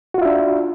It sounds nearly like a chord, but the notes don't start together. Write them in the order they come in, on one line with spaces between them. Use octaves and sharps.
F#4 F4 E5 D4